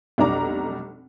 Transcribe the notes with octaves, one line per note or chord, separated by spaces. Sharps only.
F1 B1 G3 D4 A#5 D6